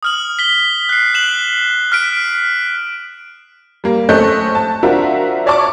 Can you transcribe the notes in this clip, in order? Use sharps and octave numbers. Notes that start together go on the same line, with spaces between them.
D#6 F6 F#7
B6 G7
F#6 C7
F#6 E7 F#7
F6 B6 D7
G3 A#3
A3 C4 C#4 D#5 F#6 G6
A5
C4 D4 F4 F#4 A#4 E5
C#5 D5 A5 C#6 D6